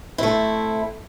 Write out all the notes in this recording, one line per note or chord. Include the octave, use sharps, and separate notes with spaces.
A3 C4 E4